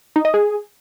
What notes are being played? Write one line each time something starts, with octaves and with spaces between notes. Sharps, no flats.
D#4
D#5
G#4